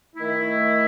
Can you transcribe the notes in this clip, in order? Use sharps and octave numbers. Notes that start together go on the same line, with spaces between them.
D#3 A3 E4